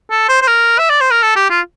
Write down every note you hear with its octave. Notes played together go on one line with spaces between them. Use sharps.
A4
C5
C5
A#4
E5
D5
C5
A#4
A4
G4
F4